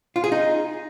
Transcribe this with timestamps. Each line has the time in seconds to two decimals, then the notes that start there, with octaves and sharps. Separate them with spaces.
0.16 F4
0.24 G#4
0.32 D#4